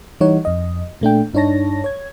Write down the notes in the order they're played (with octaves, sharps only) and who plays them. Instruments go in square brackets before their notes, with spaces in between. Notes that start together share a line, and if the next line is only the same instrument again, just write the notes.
[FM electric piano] E3 G3 D#4 C#5 F#5
F2 D#5
A#2 A3 D4 G5
G2 D4 D#4 C#5 A5 A#6
C#5 G#6